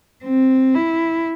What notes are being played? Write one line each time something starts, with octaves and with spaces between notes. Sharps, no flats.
C4
E4